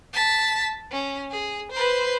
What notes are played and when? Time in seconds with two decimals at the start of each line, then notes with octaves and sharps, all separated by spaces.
0.13 A5 B6
0.92 C#4
1.31 G#4
1.72 B4 C5